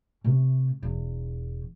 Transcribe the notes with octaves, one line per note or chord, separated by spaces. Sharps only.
C3 A3
E1 E2